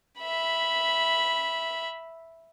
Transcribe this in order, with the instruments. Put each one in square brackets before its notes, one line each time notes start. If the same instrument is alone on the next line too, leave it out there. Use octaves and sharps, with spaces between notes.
[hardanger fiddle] E5 B5